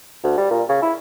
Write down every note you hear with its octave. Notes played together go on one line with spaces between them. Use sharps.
D2
G3
A#2
C#3
E4